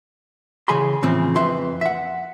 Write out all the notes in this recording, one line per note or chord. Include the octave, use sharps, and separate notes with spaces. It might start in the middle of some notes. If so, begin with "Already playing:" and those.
C#3 E3 G#4 G#5 B5 C6
A2 C#3 E3 F3 C4
F2 B4 E5 C6
E5 F#5